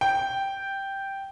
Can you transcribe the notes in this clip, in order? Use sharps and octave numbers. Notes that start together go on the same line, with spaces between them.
G5